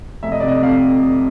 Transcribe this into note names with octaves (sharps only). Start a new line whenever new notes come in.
F1 E5
D#5
C3 D5
D#5
F2 F5